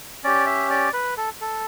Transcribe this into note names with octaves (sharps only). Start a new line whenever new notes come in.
C#4 G4 D5
E5
D5
B4
A4
A4